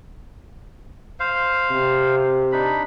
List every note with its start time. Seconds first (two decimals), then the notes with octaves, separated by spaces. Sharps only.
1.20 C5 F5
1.71 C3
2.52 D4 D#4 B5